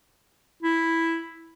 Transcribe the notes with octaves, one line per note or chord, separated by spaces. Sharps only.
E4